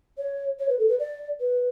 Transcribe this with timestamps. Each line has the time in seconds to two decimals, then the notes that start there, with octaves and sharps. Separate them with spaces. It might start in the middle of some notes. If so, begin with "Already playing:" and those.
0.18 C#5
0.59 C#5
0.69 B4
0.79 A4
0.89 B4
0.99 D5
1.40 B4